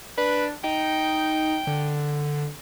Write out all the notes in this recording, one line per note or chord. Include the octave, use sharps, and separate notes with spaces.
D4 B4
D#4 G5
D3